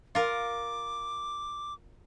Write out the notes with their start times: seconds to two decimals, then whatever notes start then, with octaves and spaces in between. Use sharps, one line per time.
0.15 F4 A#4 D6